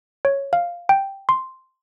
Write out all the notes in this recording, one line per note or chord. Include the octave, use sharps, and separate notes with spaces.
C#5
F5
G5
C6